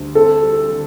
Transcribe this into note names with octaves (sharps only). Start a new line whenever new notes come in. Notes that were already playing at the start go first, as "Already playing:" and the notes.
Already playing: D2 D3 G3
C4 A4
G3
D3